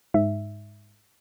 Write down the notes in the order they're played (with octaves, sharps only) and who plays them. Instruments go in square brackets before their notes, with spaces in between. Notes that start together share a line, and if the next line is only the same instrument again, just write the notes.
[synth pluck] G#2 E5